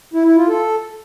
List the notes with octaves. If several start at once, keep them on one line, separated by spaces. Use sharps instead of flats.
E4
E4
F4
A4